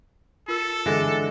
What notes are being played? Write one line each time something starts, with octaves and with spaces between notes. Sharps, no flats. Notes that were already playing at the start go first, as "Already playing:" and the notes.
F4 A4 A#4 E6
D3 E3 G#3 D4